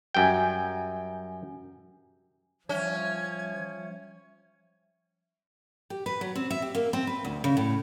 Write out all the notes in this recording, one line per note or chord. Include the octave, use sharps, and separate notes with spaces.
F#2 G3 G5 G#5 G6
F3 G3 C#4 E5 G#6
G4
B4
F#3
C4
E5
G4
A#3
C4
B4
D2
C#3
A2